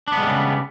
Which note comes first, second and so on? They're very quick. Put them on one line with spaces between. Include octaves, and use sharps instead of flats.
D4 B3 G#3 G3 C#3